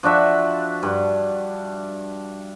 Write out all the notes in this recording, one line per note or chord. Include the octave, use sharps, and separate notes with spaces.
F3 D4 F#4 E5
G2